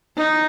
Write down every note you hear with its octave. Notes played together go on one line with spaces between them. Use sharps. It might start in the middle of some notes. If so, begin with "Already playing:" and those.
D#4